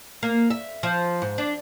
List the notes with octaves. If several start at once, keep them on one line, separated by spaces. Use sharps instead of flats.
A#3
E5
F3
G#2
D4